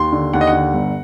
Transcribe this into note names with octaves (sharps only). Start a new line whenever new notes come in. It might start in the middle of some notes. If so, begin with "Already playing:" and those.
Already playing: D#2 C6
D3
D#2 F#5
D#5
F#5
D3
G1